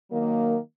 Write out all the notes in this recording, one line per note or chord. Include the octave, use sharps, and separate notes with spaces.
D#3 F#3 A#3